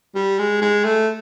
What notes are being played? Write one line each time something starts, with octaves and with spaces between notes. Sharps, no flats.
G3
G#3
G#3
A3